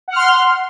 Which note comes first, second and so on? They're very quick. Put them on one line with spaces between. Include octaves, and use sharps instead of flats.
F#5 F6 C6